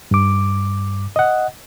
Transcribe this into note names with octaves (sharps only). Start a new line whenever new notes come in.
G2 D6
D#5 F#5